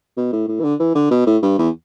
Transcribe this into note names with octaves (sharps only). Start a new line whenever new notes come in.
B2
A2
A2
E3
D3
E3
D3
B2
A2
G2
E2